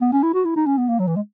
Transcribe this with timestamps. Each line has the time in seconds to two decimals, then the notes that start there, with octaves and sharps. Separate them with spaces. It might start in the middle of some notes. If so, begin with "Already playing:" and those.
0.01 B3
0.12 C#4
0.23 E4
0.34 F#4
0.45 E4
0.56 D#4
0.66 C#4
0.78 B3
0.89 A#3
0.99 F#3
1.07 E3
1.16 G#3